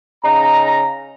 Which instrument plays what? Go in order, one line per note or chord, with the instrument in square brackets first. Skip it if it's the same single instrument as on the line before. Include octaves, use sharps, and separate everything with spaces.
[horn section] C#3 D#4 A#5